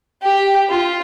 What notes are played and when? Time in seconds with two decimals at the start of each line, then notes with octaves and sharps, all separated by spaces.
0.22 G4
0.69 F4